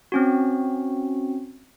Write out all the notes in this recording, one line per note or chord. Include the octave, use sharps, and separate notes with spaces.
C4 C#4 F#4